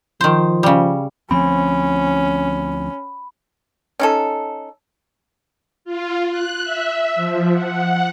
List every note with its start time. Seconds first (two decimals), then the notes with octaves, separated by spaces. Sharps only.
0.21 D#3 F3 C5
0.63 C#3 G3
1.31 D2 F3 C4 C#4 B5
3.99 C#4 D#4 A4
5.85 F4
6.30 F#6
6.63 E5
7.16 F3
7.52 F#5